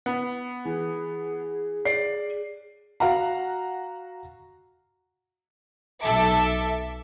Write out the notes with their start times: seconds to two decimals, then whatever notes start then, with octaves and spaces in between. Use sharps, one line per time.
0.06 B3
0.65 E3 G#4
1.85 D5 C7
3.00 F#4 F5 F#5 A#5
6.01 B1 A4 E5 D6